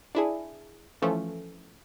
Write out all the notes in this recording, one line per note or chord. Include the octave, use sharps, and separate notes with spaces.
D4 E4 G#4
E3 F3 A3 C#4